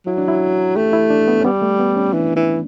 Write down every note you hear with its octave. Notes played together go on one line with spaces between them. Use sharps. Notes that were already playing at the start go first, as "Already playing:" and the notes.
F#3 E4
D4
E4
A3 G4
E4
D4
B3
C#4
G3 B3
A3
B3
C#4
E3 D4
E3